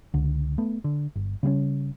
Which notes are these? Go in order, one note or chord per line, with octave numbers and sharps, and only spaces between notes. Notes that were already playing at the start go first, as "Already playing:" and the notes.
C#2 D3
A3 B3
D3
G1
C#3 G3 A3 C#4